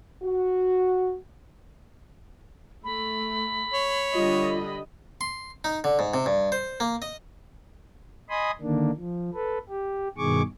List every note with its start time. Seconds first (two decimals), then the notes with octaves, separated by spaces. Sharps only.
0.23 F#4
2.84 A3 B5
3.74 C#5
4.15 D3 G3 F4 D#5
5.21 C6
5.64 D#4
5.84 D3
5.99 G#2
6.14 C3
6.26 G2
6.52 C5
6.80 A#3
7.02 D#5
8.30 D#5 G#5 B5 C6 D#6
8.61 D3 D#3 A#3 D4
8.97 F3
9.34 A4 B4
9.69 G4
10.18 G2 B2 D#3 G#4 C#6 D6